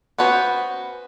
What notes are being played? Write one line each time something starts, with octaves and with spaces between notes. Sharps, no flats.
B3 C#4 F#4 B4 C5